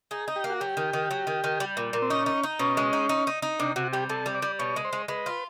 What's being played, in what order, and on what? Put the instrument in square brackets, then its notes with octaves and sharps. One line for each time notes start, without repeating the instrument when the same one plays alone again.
[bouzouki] D#4 [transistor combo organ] G#4
[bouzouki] D#4
[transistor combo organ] G4
[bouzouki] A#3
[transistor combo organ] F#4
[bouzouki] F#3 [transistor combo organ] G4
[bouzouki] D#3
D#3
F#3
D#3
D#3
G3
A#2
A#2
[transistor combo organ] C4
[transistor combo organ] C#4 [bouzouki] D#4
[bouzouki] D#4
D#4
[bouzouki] B2 [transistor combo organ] C#4
[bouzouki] G#3
D#4
D#4
D#4
D#4
[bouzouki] C3 [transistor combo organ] D4
[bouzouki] C3 [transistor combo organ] F#4
[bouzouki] G3 [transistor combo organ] G4
[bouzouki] C3 [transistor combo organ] A4
[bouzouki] G3
[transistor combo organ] D5
[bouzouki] G3
[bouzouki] B2 [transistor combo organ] C#5
[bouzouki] G#3
[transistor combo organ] C5
[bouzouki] G#3
[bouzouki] G#3 [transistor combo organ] B4
[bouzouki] F4